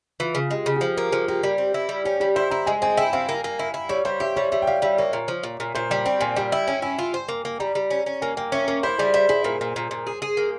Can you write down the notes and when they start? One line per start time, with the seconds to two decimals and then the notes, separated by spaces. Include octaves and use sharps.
0.20 E3 F4
0.35 C#3
0.51 G#3 G4
0.66 C#3
0.76 G4
0.81 F3 G#4
0.97 A#3 A#4
1.12 F3 G#4
1.28 A#3 G4
1.43 G3
1.58 C4
1.74 E4
1.89 G3
2.05 C#4 G4
2.20 G3 G4
2.36 E4 C5
2.51 E4 A#5
2.67 G#3 G#5
2.82 C4 G#5
2.97 E4 G5
3.13 C4 F5
3.29 A#3
3.44 A#3
3.59 E4
3.74 E4
3.89 G3 C#5
4.05 G3 C5
4.20 G4 E5
4.36 G3 C#5
4.52 G3 E5
4.62 G5
4.67 G3 F5
4.82 G3 E5
4.98 A#3 C#5
5.13 A#2
5.28 F3
5.43 A#2
5.60 A#2
5.75 A#2 C5
5.90 G3 G5
6.06 C4 G5
6.21 A#2 G#5
6.36 G3 G5
6.52 E4 G5
6.67 C#4 G#5
6.82 E4 G#5
6.99 F4
7.14 C5
7.29 A#3
7.45 A#3
7.60 G3 A#5
7.75 G3
7.91 C#4
8.06 C#4
8.22 A#3 G#5
8.37 A#3 G5
8.52 C#4 E5
8.68 A#3 C#5
8.83 E4 C5
8.98 G3 G#4
9.14 E4 C5
9.29 E4 G#4
9.44 A#2 A#4
9.61 A#2
9.76 A#2
9.91 A#2
10.07 G#4
10.22 G#4
10.37 A#3